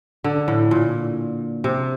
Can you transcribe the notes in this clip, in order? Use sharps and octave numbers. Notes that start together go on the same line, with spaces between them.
D3
A2
A#2
C3